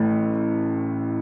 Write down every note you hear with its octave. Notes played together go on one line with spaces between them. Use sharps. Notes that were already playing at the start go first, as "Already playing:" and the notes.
Already playing: A1 A2 E3 A3